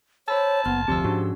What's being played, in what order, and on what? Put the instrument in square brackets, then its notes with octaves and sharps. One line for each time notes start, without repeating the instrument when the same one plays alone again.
[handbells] C5 B5 E6 [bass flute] C#5 [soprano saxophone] A5
[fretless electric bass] F#1 [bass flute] B3 [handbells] C6 F6
[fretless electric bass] F1 D2 C4 [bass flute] F3 [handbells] G4 C6 E6
[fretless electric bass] G#2 [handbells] C#4 D4 F#4